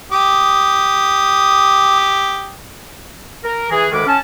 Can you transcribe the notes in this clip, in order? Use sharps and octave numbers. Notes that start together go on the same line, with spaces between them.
G4 D#6
A#4
E3 G#4
D2 D#3 G#3 A4 B4 D6
C#4 A5